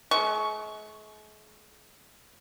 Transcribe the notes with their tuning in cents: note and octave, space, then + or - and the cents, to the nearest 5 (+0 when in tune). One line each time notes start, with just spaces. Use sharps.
G#3 +45 C#6 +0